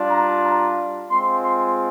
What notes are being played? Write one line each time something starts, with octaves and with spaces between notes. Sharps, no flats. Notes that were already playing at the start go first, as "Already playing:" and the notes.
Already playing: G3 D4 F4
A#5
A#5
G#3 C4 F4 C6
C6